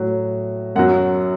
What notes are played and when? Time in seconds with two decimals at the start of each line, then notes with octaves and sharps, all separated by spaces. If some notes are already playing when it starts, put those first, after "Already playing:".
Already playing: A2 F#3
0.76 F#2 F#3 F#5